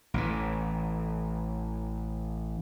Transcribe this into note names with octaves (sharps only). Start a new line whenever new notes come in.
A1 E3